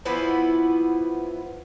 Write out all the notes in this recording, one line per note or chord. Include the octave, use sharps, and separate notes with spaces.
E3 F3 B3 E4